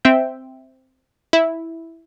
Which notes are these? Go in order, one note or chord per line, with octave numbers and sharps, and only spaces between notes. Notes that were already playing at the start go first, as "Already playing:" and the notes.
C4 E5 G5
E4